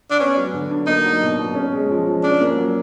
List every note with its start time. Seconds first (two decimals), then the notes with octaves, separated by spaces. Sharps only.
0.10 D4
0.20 B3 C#4
0.37 F#3
0.54 D3
0.71 D4
0.87 A#3 D#4
1.05 F#3
1.22 B2
1.38 B2
1.55 C#4
1.73 G#3
1.89 F3
2.06 F3
2.23 C#4 D4
2.41 A#3
2.57 F#3